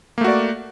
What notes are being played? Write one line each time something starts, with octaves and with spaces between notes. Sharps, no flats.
A3 A#3 F#4 D5